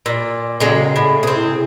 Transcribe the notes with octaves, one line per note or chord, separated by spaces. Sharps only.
A#2 E6
A#2 C#3 F#3 G#3 G#4 A4 G5
A2
C3 C4 G#4
E4